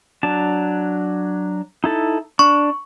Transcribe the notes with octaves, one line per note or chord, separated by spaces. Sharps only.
F#3 D4 A5
D#4 E4 A4
D4 C#6